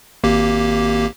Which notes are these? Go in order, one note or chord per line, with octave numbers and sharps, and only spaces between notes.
G#1 A#3 G4